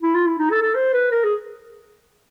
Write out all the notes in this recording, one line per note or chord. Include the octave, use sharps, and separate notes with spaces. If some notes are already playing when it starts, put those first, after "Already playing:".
E4
F4
E4
D#4
A4
A4
C5
B4
A#4
G#4